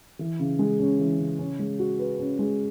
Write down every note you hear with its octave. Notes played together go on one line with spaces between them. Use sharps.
E3
C#3
G#3
C#4
E3
C#3
C#4
G#3
F#4
B4
C#4
G#3